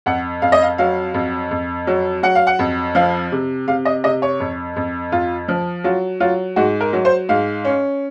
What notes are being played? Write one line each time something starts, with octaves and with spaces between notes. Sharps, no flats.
F2 F#5
F2 F5
D#5
F5
F#3 F5
F2
F2
F#3
F#3 F#5
F5
F#5
F2
F3 F5
C3
C3 F5
D#5
C3 D#5
C#5
F2
F2
F2 F4
F3
F#3 F4
F#3 F4
G#2 F#4
A#4
F#3
C5
G#2 F5
C#4